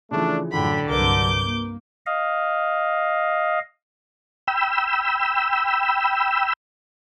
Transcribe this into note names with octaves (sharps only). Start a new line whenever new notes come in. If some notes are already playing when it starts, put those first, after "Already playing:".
C#3 E3 F3 A3 D4
F#2 A2 D3 G5 B5
C2 G2 F#3 A#4 B4 D6 G6
A#3
D#5 F5
G5 B5 E6